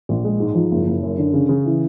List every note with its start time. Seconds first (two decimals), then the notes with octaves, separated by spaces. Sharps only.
0.09 A#1
0.24 G#3
0.40 G#2
0.55 F3
0.71 F#1
0.87 F#1
1.03 F#2
1.18 D3
1.33 C#3
1.49 C#3
1.65 E3